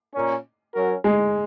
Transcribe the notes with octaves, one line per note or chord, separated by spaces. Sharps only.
A#2 A#3 C#4
F#3 C#4 F#4 A#4
G#3